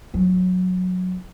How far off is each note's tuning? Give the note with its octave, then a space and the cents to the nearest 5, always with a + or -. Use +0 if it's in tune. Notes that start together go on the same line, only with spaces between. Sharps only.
F#3 -15